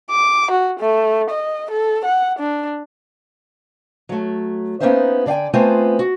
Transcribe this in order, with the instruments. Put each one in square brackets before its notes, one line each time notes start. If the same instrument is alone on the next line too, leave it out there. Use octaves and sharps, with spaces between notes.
[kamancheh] D6
F#4
A3
D#5
A4
F#5
D4
[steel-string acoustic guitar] F#3 A3
A#3 B3 C#4 D#4 C5 E5
D3 D5 F5 G5 G#5
A3 B3 C4 F4 C5 G#5
F#4